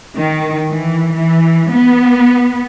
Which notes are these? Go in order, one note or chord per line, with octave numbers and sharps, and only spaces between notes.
D#3
E3
E3
B3